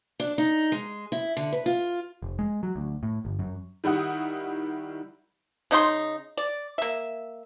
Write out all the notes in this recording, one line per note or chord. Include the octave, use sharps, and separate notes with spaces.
D4
D#4
G#3
E4
D3
B4
F4
F1
G#3
F#3
D2
A2
G1
F#2
D#3 G3 E4 F#5 D#6
C#3 D#4 F#4 C6
D5
A#3 E5